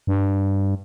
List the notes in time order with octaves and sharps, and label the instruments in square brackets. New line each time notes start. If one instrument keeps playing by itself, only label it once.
[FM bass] G2